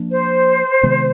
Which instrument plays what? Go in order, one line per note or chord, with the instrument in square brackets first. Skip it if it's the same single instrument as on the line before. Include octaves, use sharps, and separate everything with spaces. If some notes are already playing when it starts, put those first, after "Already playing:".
Already playing: [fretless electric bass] F3 A#3 D4
[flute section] C5
[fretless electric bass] C3 D#3 G#3 B3